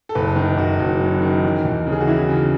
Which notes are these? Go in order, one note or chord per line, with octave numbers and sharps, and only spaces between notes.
A4
F#1 B4
D#3
F#1 F#4
F#1
F#2
D#3
E3
D#2
C#3
G#4
F#4
E3 E4
C#3